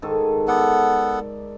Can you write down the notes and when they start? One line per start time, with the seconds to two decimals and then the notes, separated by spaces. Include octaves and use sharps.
0.02 G#2 D#3 A4
0.48 B3 A4 D5 F#5